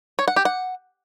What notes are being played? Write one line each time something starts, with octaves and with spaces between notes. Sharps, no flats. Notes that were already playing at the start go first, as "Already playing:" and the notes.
C#5
F#5
G4
F#5